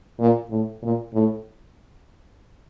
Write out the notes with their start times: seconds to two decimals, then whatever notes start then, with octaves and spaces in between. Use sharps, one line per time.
0.20 A#2
0.50 A2
0.82 A#2
1.14 A2